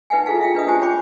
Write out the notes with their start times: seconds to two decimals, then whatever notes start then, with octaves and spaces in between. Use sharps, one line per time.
0.10 D#4 B4 E5 F#5 G#5
0.26 E4 F4 G#4 A4 F5 A5
0.41 E5 F5 G5
0.55 D4 E4 B4 D#5 E5 D#6
0.67 C#4 F4 G4 C5 G#5 A5
0.82 C#5 G5 B5 D6